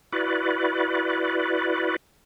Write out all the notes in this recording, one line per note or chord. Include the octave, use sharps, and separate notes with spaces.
E4 F#4 B4 D5